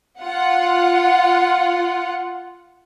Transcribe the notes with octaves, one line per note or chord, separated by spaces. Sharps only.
F4 F#5